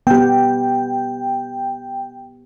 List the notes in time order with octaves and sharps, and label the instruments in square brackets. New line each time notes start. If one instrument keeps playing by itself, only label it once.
[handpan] B3 G4 [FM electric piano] G5